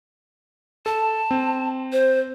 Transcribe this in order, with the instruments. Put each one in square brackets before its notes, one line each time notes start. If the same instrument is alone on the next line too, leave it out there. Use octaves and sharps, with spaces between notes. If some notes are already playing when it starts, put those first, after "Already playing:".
[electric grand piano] A4 [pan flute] A5
[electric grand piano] C4
[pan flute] C5